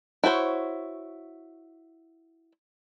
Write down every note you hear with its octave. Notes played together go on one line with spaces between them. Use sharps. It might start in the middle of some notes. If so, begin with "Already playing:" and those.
E4 F#4 C5 C#5